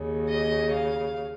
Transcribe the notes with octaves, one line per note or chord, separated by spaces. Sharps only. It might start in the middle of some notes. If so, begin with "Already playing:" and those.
Already playing: D#2 C#3
D#5
F5